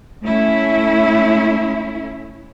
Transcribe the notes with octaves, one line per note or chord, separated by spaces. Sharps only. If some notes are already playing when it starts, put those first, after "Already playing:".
A3 C#4 E4